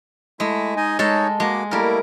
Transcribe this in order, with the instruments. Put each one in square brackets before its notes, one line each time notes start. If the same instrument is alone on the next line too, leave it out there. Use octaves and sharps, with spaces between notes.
[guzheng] G#3 [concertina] A3 E4 E5
[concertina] D#4 D#5 G#5
[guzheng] G#3 A4 [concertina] D#4 C#5
[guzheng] G#3 [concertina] A#3 F#4 D6
[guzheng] G3 A#4 [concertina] A3 A#3 E4